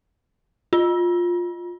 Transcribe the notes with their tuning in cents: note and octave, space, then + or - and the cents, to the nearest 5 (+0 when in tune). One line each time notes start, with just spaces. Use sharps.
F4 +10